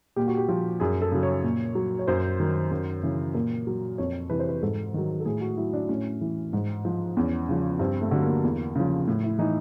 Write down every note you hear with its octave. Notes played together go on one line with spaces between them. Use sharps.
A#2 G4
F#4
G4
F3
F#2 G#4
A4
C#3 F#3
C#5
A#2
F#3
C#5
F#2 C5
D#3 F#3
F#2
C#3 E3
A#2 A#4
F#3
F2 C#5
C3 E3 B4
C5
B4
G#2 A4
D#3 F#3
A4
A2 G#4
F#4
F#3 E4
D4
A2 C#4
E3
G#2
F3
E2 C#4
C#3 F3
G2 C4
A3
D3 F#3
A#3
E2
C#3 F3
A2
E4
E3 D#4